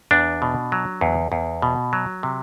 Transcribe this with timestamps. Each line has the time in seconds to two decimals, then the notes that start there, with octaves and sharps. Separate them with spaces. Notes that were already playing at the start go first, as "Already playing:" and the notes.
0.11 E2 D4
0.42 B2
0.72 F#3
1.01 E2
1.32 E2
1.62 B2
1.93 F#3
2.23 C3